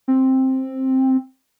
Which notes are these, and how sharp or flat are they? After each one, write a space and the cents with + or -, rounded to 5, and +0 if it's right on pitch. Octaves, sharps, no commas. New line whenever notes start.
C4 +10